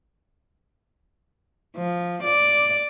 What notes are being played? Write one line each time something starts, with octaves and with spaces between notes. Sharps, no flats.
F3
D5